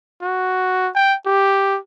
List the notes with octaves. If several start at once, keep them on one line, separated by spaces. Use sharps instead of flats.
F#4
G5
G4